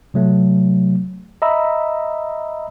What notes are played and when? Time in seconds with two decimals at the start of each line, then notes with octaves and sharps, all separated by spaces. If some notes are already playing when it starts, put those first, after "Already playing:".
0.14 C3 F#3 A3
1.42 D#5 E5 A#5 B5 E6